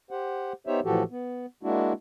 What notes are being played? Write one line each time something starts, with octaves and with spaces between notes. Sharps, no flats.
G4 C5 F#5
B3 D#4 G4 C5 C#5 E5
A2 E3 F3 F#4 G4 A4
B3
G#3 A#3 D4 E4 F#4